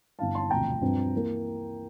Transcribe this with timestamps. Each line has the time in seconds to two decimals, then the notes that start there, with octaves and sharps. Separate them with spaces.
0.19 G1 G2 E3 F5 A5
0.35 A5 C6
0.50 E1 D2 C3 F3 G5 A#5
0.82 G2 F3 C4
1.15 E3 A#3